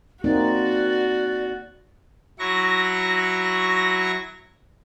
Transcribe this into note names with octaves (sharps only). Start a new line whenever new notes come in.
A#3 C4 D#4 F#4 D5
F#3 E4 C#6 A#6